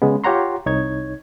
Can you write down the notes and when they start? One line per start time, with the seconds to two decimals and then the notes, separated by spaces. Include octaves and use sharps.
0.02 C#3 G#3 B3
0.24 F4 G4 C#5 F#5 A#5 C6
0.66 C2 D#4 C#5 G#6